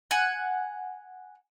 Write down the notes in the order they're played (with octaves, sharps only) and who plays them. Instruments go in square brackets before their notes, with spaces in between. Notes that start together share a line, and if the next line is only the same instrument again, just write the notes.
[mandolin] F#5 G#5